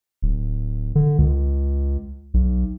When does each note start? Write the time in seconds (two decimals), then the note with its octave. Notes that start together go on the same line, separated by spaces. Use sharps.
0.22 D1
0.95 D3
1.18 C#2
2.34 B1